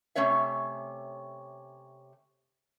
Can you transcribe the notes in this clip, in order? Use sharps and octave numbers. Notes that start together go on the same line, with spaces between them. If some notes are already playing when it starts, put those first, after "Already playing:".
C3 A3 C#4 C#5 E5